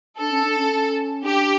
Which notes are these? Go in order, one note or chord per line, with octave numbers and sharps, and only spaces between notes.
D4 A4
C#4
D4
C#4
C#4
D4 G4